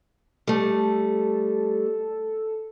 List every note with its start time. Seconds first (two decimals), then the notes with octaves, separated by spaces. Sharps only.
0.47 G3 A3 A4